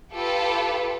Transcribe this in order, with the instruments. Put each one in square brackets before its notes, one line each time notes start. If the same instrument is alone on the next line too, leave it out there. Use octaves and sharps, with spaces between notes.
[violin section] F4 G4 A4 B4